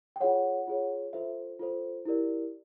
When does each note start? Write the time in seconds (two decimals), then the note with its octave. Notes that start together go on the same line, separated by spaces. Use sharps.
0.16 G5
0.20 F4 G#4 C#5 F#5
0.67 F4 G#4 C#5
1.13 F4 A4 C5 E5
1.59 F4 A4 C5
2.05 E4 G4 A#4 D5